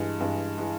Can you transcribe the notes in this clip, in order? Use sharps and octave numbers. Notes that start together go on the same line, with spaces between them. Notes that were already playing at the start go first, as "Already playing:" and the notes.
Already playing: G2 E3 G#3
G2 E3 G#3
E3 G#3